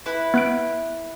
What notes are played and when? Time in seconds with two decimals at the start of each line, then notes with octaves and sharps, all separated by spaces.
0.06 E4 B4
0.34 B3 F#6 D7